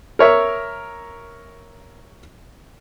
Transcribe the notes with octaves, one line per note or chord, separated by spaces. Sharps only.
A#4 C#5 E5